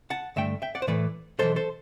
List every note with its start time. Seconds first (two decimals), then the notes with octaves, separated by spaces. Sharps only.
0.10 F#5 A5
0.36 G2 D3 A3 E5 G5
0.62 E5 G5
0.75 D5 F#5
0.82 C5
0.87 A2 E3 A3 B4 D5
1.39 B1 A2 E3 A4 C5
1.56 A4 C5